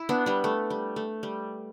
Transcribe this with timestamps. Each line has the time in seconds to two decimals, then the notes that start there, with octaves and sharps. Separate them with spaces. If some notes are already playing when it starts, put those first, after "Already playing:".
Already playing: E4
0.09 B3 D4
0.26 G3 B3
0.44 A3
0.70 G3
0.96 A3
1.23 G3